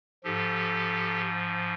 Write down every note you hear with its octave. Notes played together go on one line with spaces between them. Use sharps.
G#2 F3 G4 A4